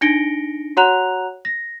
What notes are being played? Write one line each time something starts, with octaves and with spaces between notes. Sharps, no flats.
D4 D#4 A#6 C#7 D7 G7
F#4 C#5 F#5 A#5 F#6 F7
A#6